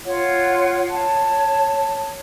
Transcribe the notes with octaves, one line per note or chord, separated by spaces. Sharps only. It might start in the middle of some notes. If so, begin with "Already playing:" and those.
F4 C#5 F#5
C#5 A5